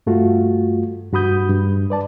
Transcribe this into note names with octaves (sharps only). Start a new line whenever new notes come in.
G2 A3 F4 F#4
G2 F#4 B5 D#6 G6
G2
B4 D5 A5